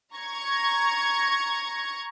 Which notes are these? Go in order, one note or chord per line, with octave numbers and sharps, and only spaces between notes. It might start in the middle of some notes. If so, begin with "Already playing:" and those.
A#5 C#6 G#6